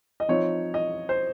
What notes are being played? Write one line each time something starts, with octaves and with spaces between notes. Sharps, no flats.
D#5
F3 C4 D#4 C#5
D#5
C5